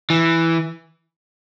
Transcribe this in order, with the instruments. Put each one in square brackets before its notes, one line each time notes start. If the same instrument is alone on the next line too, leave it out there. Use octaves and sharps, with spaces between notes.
[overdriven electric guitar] E3